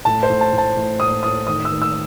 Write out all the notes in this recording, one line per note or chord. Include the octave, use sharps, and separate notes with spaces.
A2 A5
C5
A2
A5
A2
A5
A2
A2 D#6
A2 D#6
D#3 D#6
E6
D#3
E6